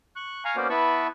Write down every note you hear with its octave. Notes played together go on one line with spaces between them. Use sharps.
C#6 F#6
F5 G#5 A#5 C#6
A#3 B3 C#4 F#4 C5 D5
B3 E4 B4 A5 B5 C#6